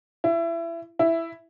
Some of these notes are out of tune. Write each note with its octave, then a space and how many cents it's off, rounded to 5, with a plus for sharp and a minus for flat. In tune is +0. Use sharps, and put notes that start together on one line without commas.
E4 +25
E4 +5